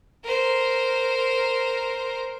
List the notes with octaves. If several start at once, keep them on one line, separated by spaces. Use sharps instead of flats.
A#4 C5